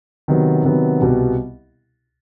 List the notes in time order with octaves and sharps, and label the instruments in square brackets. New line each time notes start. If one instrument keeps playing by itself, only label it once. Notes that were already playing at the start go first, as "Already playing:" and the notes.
[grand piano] C3 D#3 F#3 B3
C3 D#3 F#3 B3
C2 B2 G3 B3